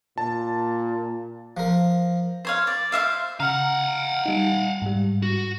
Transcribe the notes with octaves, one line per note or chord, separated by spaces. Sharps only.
A#2 A5
F3 A#4
C5 C#5 F5
D5
C5 C#5 E5 F5
C#3 F5 F#5 A#5 F6
G3 D#4
G#2 G3
F#4